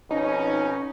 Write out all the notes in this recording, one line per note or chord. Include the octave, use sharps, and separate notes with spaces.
F2 B2 C#4 D#4